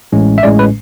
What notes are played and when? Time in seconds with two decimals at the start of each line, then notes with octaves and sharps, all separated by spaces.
0.12 A1 A2 G#3 C#4
0.38 E5
0.43 A1 A2 G#3 C#4 D5
0.59 B4